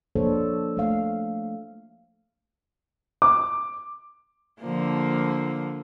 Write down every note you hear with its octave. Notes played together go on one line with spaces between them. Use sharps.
F3 A#3 D4 A4 C5 C#5
A3 F5
D6
D3 F3 A#3